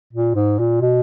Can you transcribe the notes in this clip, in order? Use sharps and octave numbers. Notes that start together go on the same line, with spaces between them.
A#2
G#2
A#2
B2